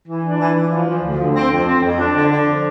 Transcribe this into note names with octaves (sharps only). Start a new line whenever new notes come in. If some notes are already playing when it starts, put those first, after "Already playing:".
E3
D4
E3
E3
F3
F3
D2
D3
C4
F2
C4
F2
D4
D3
D3
F3